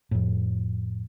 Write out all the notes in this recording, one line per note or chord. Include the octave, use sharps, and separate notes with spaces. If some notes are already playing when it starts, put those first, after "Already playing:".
F2 A2